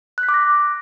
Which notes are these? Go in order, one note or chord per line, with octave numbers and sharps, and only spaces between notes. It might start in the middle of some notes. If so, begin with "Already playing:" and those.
F#6
B6
D6
A#6